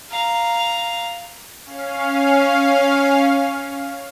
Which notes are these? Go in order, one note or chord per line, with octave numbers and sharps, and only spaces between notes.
F5 A#5
C#4 F5